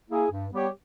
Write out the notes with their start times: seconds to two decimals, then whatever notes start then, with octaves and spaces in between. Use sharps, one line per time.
0.10 A#3 E4 G#4
0.31 G2
0.51 G3 B3 G4 C#5